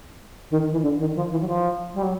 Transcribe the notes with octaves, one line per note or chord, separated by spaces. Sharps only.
D#3
E3
D3
D#3
F3
E3
F#3
F3
G3
F#3